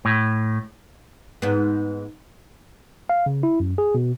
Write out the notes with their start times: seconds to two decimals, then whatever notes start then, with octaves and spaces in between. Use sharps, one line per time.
0.05 A2
1.42 G#2 B3
3.09 F5
3.26 C#3
3.43 E4
3.60 F#2
3.78 G#4
3.95 B2